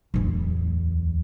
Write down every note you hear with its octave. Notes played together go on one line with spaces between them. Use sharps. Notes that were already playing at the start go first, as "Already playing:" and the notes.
D1 E2